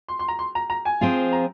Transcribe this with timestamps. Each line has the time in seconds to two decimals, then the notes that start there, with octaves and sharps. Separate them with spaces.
0.08 C6
0.19 C6
0.28 A#5
0.39 C6
0.55 A#5
0.70 A#5
0.85 G#5
1.01 F3 C4 F4 G#4
1.33 A#5